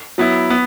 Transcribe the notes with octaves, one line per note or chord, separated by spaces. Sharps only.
F#3 B3 E4
B3